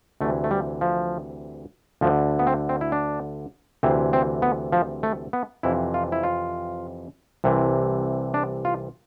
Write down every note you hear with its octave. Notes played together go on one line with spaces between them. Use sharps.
D2 C3 E3 A3
A3
G3
F3
D2 D3 F3
B3
C4
C4
E4
D4
D2 C3 E3 C4
C4
B3
F3
A3
B3
F2 C3 E3 E4
F4
E4
F4
C2 C3 E3
D4
F4